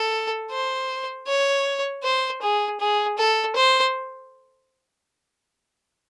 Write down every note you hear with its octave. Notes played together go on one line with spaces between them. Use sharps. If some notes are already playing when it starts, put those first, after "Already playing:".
Already playing: A4
C5
C#5
C5
G#4
G#4
A4
C5